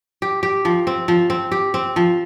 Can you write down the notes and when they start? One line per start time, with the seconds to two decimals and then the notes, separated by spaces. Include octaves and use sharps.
0.22 G4
0.43 G4
0.65 F3
0.87 C4
1.08 F3
1.30 C4
1.52 G4
1.74 C4
1.96 F3